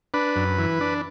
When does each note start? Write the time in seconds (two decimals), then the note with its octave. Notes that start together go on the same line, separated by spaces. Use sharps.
0.14 D4 B4
0.36 F#2
0.59 E3
0.81 D4